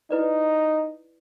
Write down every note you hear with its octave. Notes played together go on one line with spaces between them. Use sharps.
D#4 E4 B4 D5